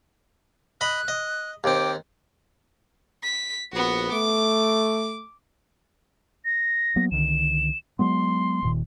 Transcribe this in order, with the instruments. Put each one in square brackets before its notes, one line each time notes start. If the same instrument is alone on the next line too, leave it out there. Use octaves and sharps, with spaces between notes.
[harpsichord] D#5 B5 [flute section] F#6
[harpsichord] D#5
[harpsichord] D#2 C4 [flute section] G5 D6
[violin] B6
[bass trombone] A#1 [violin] B3 F#4
[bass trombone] A3 [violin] D6
[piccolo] A#6
[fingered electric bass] F#3 A#3 B3
[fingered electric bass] C2 D3 D#3 [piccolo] E7
[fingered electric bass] F#3 G#3 B3 [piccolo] C6
[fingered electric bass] D#1 A#2 D#3